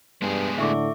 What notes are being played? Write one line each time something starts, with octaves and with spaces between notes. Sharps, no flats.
G2 G#3 B3 G#4
A2 D3 E5 C#6 D6